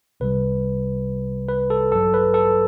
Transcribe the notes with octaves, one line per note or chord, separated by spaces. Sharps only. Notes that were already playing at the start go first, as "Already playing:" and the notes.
C2 C3 G3 B4
B4
A4
A1 G2 F#3 A4
B4
A4